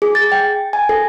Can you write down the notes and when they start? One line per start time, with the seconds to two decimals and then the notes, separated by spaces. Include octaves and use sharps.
0.02 G#4
0.15 A6
0.32 G5
0.73 G#5
0.89 A4